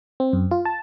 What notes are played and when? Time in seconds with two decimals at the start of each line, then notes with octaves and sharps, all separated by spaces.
0.20 C4
0.33 F#2
0.51 F4
0.65 A5